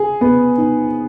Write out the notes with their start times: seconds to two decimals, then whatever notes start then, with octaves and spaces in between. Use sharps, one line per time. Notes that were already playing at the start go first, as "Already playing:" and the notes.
Already playing: G#4
0.21 B3
0.58 D#4